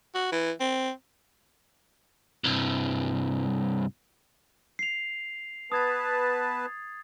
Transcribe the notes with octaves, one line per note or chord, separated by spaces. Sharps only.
F#4
E3
C4
C2 G2
C7 F7
B3 B4 A5 D#6 G#6 A6